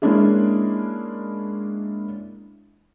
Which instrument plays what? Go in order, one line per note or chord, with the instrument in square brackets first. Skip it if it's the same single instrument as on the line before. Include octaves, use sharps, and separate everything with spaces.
[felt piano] G#3 A#3 C#4 D4 E4 G#4